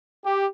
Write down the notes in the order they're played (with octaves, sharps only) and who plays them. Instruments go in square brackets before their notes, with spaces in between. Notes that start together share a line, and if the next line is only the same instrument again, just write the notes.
[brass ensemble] G4